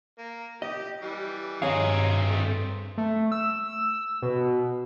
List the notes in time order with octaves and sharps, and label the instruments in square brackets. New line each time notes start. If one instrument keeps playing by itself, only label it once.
[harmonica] A#3
[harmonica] G4 [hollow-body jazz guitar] D#5
[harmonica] E3 G3
[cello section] G2 [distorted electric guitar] C4 G#4 [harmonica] D#4 G#5 [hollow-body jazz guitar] C#5 F5
[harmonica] A3
[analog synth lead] A3
E6
B2